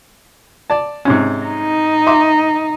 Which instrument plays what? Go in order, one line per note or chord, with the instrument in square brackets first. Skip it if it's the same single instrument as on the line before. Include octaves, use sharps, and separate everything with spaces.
[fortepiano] D5 A5
G#2 C3 C#4
[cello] D#4
[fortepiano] E5 C6 D6